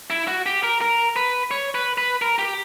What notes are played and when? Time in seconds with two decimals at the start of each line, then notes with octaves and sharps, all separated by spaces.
0.10 E4
0.27 F#4
0.46 G4
0.63 A#4
0.81 A#4
1.16 B4
1.51 C#5
1.75 B4
1.98 B4
2.22 A#4
2.39 G4